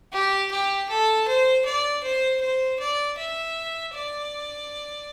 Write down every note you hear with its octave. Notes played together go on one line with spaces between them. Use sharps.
G4
G4
A4
C5
D5
C5
C5
D5
E5
D5